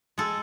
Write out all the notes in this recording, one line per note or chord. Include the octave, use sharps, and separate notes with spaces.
G#3 A4